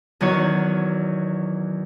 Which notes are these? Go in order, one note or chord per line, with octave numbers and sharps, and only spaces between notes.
E2 D#3 F#3 C#5